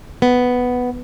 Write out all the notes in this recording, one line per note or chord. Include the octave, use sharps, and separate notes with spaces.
B3